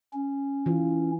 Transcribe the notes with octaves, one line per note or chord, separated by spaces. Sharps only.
C#4
E3 F4